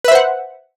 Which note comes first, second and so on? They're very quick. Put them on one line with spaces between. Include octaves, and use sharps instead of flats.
B4 E5 C5 F#5